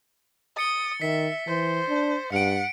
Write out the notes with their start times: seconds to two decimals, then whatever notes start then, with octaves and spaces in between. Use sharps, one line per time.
0.57 D#6 A6 C#7 G7
1.02 D#3 E5 B6
1.47 E3 C5
1.88 D4
2.32 G2 F#5 C#7 D7